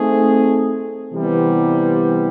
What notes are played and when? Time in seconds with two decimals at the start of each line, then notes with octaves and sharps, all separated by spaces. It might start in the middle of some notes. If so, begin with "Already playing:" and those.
Already playing: A3 C4 D#4 G#4
1.12 C3 E3 G3 B3